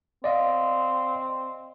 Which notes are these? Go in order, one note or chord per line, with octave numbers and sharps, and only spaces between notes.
C4 D5 D#5 F5